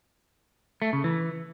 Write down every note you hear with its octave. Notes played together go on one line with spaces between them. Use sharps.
A3
C#3
E3